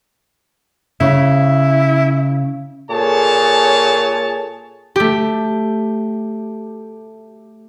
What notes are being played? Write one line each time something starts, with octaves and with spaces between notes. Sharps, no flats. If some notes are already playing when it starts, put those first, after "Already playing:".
C#3 E4
A#2 G#4 A4 C#5 A5
A3 G4